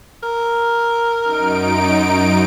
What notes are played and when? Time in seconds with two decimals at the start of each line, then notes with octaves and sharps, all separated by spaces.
0.23 A#4
1.23 F#2 D#4 D7